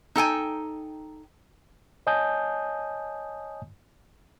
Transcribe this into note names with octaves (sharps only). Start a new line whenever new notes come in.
D#4 A4 G5 G#5
C#5 D#5 G#5 A5 D#6 G6